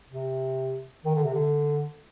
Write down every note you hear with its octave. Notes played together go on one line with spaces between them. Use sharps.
C3
D#3
D3
C3
D3